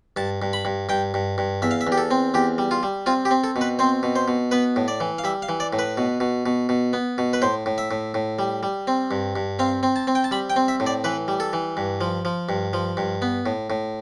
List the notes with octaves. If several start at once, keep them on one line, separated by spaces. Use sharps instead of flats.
G2 A5
G2
B5
G2
G2 G5
G2
G2
E2 E5
F5
E5
E2
G4
A4
C4
E2 G4
G3
F4
G3
C4 F4
G4
C4
A4
B2
B4
C4 C5
B2
C5
B2
B3 B4
A2
D5
E3
F5
G3 E5
F5
E3
D5
A2
B4
B2
B2
B2
B2
B3
B2
B4
A2 C5
A2
E5
A2
A2
G3
G3
C4
G2
G2
C4 F5
C4
A5
C4
G5
A5
G3 B5
G5
C4
E5
A2
D5
E3 B4
G3
A4
E3
G2
F3
F3
G2
F3
G2
B3
A2
A2